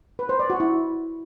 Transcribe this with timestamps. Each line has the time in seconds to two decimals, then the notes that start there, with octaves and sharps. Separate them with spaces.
0.19 B4
0.29 C5
0.39 D5
0.50 F#4
0.60 E4